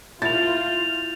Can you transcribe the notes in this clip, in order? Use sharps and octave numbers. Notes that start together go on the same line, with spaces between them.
E4 F4 G6 A6 F7